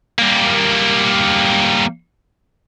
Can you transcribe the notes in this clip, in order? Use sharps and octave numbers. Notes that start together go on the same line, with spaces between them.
G3 A#3